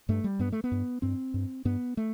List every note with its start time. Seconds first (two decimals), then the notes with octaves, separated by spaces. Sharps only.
0.09 G2 A3
0.24 G3
0.39 G2 B3
0.52 A3
0.64 B3
0.71 G2
1.02 G2 C4
1.34 G2
1.65 G2 B3
1.97 A3